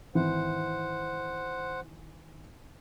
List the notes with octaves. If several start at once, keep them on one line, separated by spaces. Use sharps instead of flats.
G#1 E3 C5 F#5